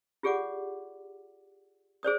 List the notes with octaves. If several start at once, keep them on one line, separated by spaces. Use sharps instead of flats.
F4 G4 G#4 D5 F#5 D6
G#4 C5 D5 D#6